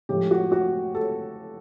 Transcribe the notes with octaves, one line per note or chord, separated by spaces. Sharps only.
A2 F3 G#3 G4
F#4
F#4
A4